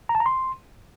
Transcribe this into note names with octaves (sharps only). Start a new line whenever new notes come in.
A#5
A5
A#5
C6